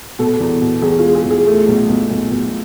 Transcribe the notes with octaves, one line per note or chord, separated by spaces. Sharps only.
B2 A4
E2
B2
E2 G#4
F4
G#3
G#4
E2
G#4
A3
B1
B1
B1
B1